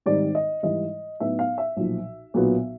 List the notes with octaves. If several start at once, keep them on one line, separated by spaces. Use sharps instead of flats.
G#2 D#3 G3 C4 D#4 D5
D#5
G#2 E3 G3 D#5
A2 F#3 B3 D#4 E5
F5
E5
B1 A#2 F3
B1 A#2 F#3 B3